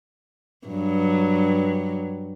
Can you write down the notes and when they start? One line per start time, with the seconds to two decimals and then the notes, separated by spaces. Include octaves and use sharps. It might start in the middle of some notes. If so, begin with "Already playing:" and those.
0.67 G2 F#3